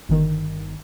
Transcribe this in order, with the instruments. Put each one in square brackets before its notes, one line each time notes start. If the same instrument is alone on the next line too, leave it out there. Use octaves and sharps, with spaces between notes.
[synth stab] G1 D#3